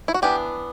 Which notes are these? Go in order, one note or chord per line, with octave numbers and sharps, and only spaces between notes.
E4
F#4
E3 B3 D4 G4